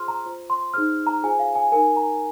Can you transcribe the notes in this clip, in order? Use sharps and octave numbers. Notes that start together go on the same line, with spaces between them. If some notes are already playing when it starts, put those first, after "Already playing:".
Already playing: F4 G#4 C5 C6 F6
A#5
F4 C5
C6
D#4 G#4 C5 F6
A#5
F4 G#4 C5 G#5
F5
G#5
D#4 A#4 G#5
A#5